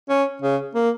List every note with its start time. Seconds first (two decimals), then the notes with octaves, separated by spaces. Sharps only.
0.09 C#4
0.42 C#3
0.75 A#3